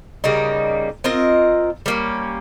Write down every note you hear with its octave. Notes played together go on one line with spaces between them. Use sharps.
C#3 G3 A#3 D#4
C4 F4 A#4 D#5
G3 A#3 C#4